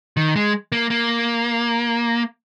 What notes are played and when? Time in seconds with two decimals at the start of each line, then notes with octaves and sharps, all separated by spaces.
0.17 D#3
0.36 G#3
0.72 A#3
0.90 A#3